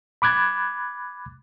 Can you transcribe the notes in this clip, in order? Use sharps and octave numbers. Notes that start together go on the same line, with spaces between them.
B5 D6 F#6 G#6 A6